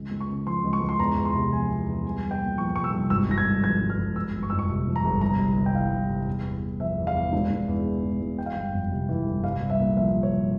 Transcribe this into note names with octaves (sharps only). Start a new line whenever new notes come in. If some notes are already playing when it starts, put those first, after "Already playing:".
Already playing: C#2
C#2
C#6
C#3
F3 C6
C#2
C#6
C#2
C6
E2 A#5
E2
C6
C3
F3 G#5
E2
E2
C2 G#5
C2
G5
A#2
F3 C#6
C2 C#6
E6
C2
G#1 E6
G#1 A#6
G#6
G2
F3 G#6
G#1
F6
G#1
F3 E6
G1
C#6
F2 E6
C#6
C3
F3
A#5
G1
C2 A#5
C2
C3
G5
E3 F5
C2
C2
E2
E2
C3
F3 E5
E2
F5
E2
E1
E1
E2
E3
E1
E1
E3 G5
F5
G1 G5
F2
C3
E3
G1
C2 F5
C2
E5
A#2
F3 E5
C2
C#5
C2